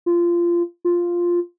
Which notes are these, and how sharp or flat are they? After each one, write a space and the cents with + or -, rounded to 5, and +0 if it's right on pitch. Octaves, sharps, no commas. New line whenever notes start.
F4 -20
F4 +0